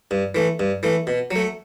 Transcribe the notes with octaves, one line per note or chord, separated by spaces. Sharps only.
G2
E3 A3
G2
E3 A3
B2
F#3
A3